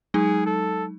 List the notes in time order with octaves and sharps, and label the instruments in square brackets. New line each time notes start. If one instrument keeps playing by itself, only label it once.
[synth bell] F#3 G#3 D#4 [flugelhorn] G#4
[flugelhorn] A4